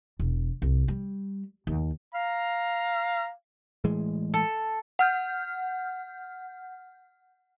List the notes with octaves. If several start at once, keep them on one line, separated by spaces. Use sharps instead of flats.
E1
C2
G3
D#2
F5 A#5
A2 E3 G#3
A4
F#5 F6 G6